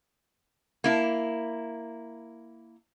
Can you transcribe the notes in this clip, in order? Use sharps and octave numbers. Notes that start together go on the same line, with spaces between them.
A#3 E4